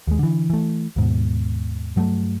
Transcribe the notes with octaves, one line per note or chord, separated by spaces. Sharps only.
D#2 G#3
D3 E3
E3 A3
D#2 G#2 B2
G2 F#3 G#3 A3